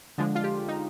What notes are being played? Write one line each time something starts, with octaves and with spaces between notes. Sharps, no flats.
D3 F3 G#3 D4
F4
G4
D#4